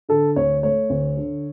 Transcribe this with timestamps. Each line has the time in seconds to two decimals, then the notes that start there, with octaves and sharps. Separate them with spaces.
0.09 D3 A4
0.36 D2 C#5
0.63 A3 C#5
0.90 D2
1.17 D3